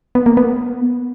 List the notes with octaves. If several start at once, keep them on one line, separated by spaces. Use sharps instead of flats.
B3
A#3
B3